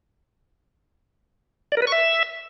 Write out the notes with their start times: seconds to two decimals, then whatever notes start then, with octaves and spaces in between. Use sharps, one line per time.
1.72 D5
1.77 A#4
1.82 B4
1.87 C#6
1.92 E5